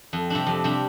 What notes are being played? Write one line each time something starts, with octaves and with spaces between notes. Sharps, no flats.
F2
C3 G3 D4
F2
C3 G3 D4